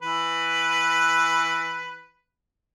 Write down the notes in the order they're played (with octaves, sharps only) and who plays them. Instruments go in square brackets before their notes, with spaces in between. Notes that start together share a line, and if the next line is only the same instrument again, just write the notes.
[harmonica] E3 B4